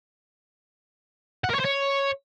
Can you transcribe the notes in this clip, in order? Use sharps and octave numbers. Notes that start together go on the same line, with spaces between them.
F#5
A#4
C#5
C5
C#5